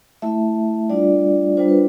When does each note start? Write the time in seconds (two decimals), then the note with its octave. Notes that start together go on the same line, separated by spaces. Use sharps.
0.22 A3 E4 E5
0.89 G3 D4 F4 D5
1.57 G3 D4 F4 C5
1.68 B4